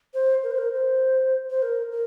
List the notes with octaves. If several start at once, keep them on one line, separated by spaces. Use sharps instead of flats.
C5
A#4
C5
A#4
C5
C5
A#4
A#4